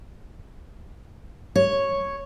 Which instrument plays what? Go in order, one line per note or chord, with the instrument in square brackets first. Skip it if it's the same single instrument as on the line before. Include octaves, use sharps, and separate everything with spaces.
[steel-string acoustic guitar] C#5